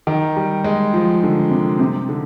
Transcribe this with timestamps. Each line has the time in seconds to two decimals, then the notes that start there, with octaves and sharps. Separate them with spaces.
0.07 D#3
0.36 G3
0.64 G#3
0.94 F3
1.23 D3
1.51 C3
1.79 C3
2.09 D3